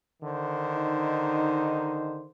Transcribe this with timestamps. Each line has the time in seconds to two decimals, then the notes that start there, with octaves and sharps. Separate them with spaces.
0.23 D3 D#3 C5
0.75 D#4